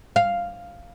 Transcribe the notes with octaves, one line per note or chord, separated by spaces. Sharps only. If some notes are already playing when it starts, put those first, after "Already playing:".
F5